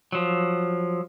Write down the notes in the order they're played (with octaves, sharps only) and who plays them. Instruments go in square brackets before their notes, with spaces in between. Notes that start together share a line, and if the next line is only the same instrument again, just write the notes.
[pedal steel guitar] F3 F#3